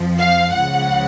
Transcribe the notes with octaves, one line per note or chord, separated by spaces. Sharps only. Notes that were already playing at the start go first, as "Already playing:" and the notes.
Already playing: F2 F3
F5
C#2 C#3 F3 F#5